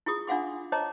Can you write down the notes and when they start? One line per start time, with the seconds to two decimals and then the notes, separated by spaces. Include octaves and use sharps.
0.06 E4 F4 G#4 D#6
0.27 D4 F4 F5 F#5 C6 D6
0.72 C5 C#5 D#5 A5 A#5 D6